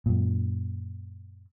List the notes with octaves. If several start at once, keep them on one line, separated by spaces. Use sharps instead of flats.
F#2 A#2